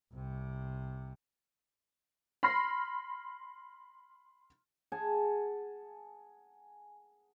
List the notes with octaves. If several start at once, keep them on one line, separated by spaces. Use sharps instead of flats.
C2 C3
B5 C6 F6 A#6 C7
G#4 F#5 G#5 A5